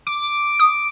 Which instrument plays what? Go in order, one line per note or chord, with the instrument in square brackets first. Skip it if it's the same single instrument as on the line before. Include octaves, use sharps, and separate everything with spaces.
[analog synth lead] D6
[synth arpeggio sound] D#6